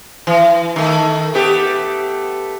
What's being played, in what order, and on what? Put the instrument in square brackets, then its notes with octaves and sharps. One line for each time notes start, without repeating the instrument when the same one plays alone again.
[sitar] E3
D#3 A3
A3 B3 G4